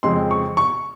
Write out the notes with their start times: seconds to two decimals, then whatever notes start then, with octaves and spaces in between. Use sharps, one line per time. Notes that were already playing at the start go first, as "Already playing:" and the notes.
0.03 F2 C#3 G#3 C4 C6
0.31 C#6
0.57 C#6